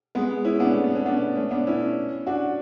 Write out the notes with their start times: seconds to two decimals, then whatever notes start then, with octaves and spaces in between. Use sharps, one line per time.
0.15 G#3 B3
0.45 C#4 E4
0.60 B3 D4
0.74 A3
0.84 B3
0.95 C#4
1.06 B3 D4
1.36 A3 C#4
1.51 B3 D4
1.67 C#4 E4
2.27 D4 F#4